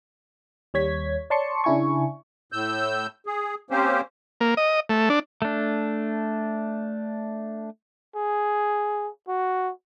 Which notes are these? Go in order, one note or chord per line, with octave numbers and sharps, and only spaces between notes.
D#2 G3 C#5 G#6 B6
C#5 D5 A5 C6 C#6 C#7
C#3 D4 E4 G#5 C#6
A2 E6 G6
G#4
A#3 C4 C#4 G4 C5
A#3
D#5
A3
D4
A3 D4
G#4
F#4